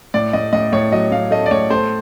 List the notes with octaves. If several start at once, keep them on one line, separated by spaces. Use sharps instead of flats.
A2 D5
A2 D#5
A2 D#5
A2 C#5
F#3 D#5
A2 F5
A3 D#5
D5
A2 C#5
A3 C5